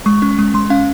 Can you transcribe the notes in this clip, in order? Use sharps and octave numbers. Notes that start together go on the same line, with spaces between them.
G#3 C#6
C#4
G#3
G#3 C6
C#4 F5